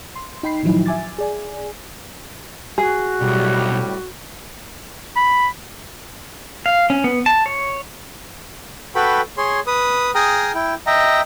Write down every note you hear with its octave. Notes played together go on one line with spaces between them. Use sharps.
C6
D#4 G5 B5 C7
A2 D#3 F3 F#3 D#4 E4
E5 G#5 D6 A6
G#4 D5 G#5
F#4 G#4
B1 A2 C3 G3
B5
F5
C#4
B3
A5
C#5
F#4 A4 B4 G5 B5
G#4 C#5 C6
B4 D#6
G#4 G5 A#5 D#6 F6
E4 G5
D#5 E5 G5 A#5